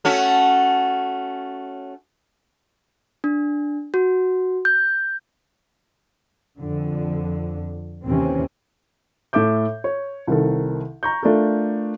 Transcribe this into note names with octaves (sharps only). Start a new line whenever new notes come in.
A3 C#4 F#4
D4
F#4
G6
F2 D3
D#2 C3 E3 C4 C#4
A2 A4 E5 D6 G6
C#5
C2 D#3 A4
A#5 C#6 G6
A3 D4 F4 A4 A#4